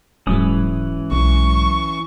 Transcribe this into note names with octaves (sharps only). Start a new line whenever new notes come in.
D#1 G#2 E3 F#3 G#3 C#4 D#6
B1 C#6